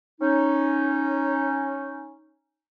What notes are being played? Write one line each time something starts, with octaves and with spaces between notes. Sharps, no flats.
C#4 D#4